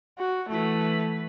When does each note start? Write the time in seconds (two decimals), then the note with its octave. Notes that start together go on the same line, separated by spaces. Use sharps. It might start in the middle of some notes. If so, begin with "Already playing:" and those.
0.18 F#4
0.50 E3 A3 B4